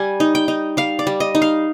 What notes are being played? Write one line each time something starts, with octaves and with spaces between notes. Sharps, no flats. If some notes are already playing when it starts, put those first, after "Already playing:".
Already playing: G3 G#5
D#4
G5
D#4
G3 F5
D5
G3
D#5
D#4
F5